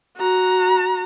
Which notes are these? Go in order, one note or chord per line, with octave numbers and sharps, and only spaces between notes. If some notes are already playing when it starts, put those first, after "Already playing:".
F#4 A#5